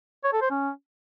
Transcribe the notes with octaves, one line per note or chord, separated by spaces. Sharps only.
C#5
A4
C5
C#4